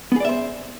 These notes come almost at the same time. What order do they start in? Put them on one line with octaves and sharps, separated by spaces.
B3 G#4 D5 E5 C5